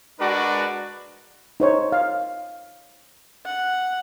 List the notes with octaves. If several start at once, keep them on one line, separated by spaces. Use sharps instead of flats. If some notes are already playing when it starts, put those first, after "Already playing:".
G#3 D4 F#4 A#4 B4 D5
D#4 C5 C#5
F5
F#5